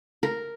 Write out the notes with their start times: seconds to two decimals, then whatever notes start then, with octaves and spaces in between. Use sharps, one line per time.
0.23 A#4